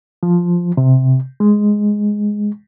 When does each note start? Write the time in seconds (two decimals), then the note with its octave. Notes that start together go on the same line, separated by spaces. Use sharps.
0.23 F3
0.77 C3
1.40 G#3